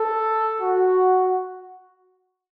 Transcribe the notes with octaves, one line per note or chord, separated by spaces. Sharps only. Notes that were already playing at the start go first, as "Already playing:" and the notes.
Already playing: A4
F#4